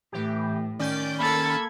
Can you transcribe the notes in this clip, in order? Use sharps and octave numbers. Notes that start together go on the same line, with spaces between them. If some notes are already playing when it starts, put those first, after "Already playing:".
A2 E3 G4
D#3 C#4 D5 G6
A#3 A4 B5 G#6 A6